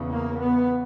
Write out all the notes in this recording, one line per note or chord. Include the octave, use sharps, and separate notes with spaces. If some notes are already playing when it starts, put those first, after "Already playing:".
Already playing: E2 C#3
A#3
B3